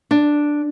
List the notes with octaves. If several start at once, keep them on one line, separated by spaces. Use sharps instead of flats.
D4